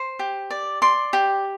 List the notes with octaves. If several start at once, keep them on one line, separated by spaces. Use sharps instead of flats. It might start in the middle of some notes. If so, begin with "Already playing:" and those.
Already playing: C5
G4
D5
D5 C6
G4